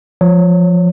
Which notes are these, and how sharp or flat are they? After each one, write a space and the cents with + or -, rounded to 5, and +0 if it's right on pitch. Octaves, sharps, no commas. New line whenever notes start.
F3 +5 C#5 +5